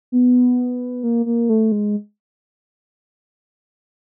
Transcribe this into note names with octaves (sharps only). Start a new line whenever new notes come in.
B3
A#3
A#3
A3
G#3